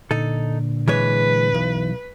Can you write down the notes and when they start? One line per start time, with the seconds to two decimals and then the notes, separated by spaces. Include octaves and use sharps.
0.11 A#2 D3 D#4 A4
0.88 E3 G#3 B4 C#5
1.54 B1 E3